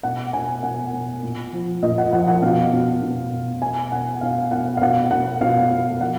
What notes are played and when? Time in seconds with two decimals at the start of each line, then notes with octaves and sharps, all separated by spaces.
0.03 B2 F#5
0.33 B2 G#5
0.63 B2 F#5
0.93 B2
1.23 A#2
1.53 F3
1.83 A#2 D#5
1.98 F#5
2.13 F3 F#5
2.28 F#5
2.42 B2 F5
2.72 B2
3.02 B2
3.32 B2
3.62 B2 G#5
3.92 B2 F#5
4.21 B2 F5
4.51 B2 F#5
4.77 F5
4.82 B2 F#5
5.11 B2 F#5
5.41 B2 F5
5.71 B2
6.01 F3 F#5